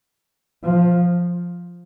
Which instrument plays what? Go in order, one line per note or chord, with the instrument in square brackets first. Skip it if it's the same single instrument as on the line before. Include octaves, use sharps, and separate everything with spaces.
[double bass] F3